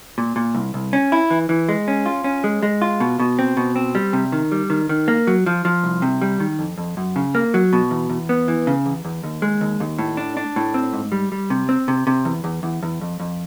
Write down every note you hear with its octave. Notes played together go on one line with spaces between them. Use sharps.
A#2
A#2
C2
C2
C#4
E4
E3
E3
G#3
C#4
F4
C#4
G#3
G#3
F4
B2
B2
C4
B2
C4
G3
C3
D#3
G3
D#3
D#3
A#3
F#3
F3
F3
C2
C3
G3
D#3
F2
F2
F#2
C#3
A#3
F#3
B2
E2
E2
B3
E3
C#3
E2
E2
D#2
G#3
D#2
D#2
A2
D4
D4
A2
C4
G#2
G3
G3
C3
C4
C3
C3
E2
E2
E2
E2
F2
F2